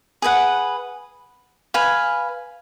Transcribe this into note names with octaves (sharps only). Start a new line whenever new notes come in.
G#4 B4 F#5
B4 F5 G#5